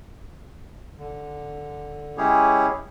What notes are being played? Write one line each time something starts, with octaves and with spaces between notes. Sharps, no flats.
D3
G#3 C#4 E4 G4 G#4 C#5